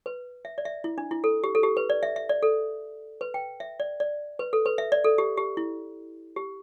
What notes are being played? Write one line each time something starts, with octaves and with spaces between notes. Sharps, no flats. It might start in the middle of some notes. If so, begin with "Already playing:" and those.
B4
E5
D5
E5
E4
D4
E4
A4
G4
A4
G4
B4
D5
E5
E5
D5
A4
B4
G5
E5
D5
D5
B4
A4
B4
E5
D5
A4
G4
G4
E4
G4